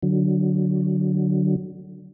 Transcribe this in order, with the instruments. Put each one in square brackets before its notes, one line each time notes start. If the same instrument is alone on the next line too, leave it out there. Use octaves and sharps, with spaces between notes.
[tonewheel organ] D3 F#3